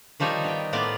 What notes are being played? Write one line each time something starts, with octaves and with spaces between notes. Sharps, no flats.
D#3 F3 G3 D#4 C#5
B3 G5
A2 A#3 B3 F4 D5